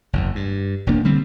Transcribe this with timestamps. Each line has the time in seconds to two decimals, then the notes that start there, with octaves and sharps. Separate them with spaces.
0.13 F#1 E2
0.35 G2
0.87 E1 G2 A#3 D4
1.04 D3 G3 A3 C4